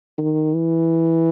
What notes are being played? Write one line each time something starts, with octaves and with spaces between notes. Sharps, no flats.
D#3
E3